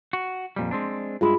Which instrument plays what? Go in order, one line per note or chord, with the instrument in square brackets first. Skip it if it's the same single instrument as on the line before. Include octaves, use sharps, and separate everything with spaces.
[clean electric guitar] F#4
F2 A#2 G3
G#3 C4 D4
[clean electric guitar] G2 G#3 E4 [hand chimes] F4 G#4 B5